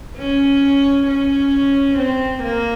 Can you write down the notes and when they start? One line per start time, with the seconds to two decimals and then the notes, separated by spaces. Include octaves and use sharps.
0.18 C#4
1.07 C#4
1.98 C4
2.43 A#3